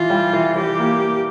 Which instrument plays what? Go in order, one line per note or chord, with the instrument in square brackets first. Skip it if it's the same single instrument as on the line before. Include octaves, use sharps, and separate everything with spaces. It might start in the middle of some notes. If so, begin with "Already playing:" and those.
Already playing: [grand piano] E3 [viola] F4
[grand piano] G3
E3
[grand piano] E3 [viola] G4
[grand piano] A#3
A#3